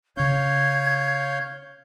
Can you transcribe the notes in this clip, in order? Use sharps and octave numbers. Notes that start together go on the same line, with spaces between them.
C#3 C#4 C#5 F5 G6 G#6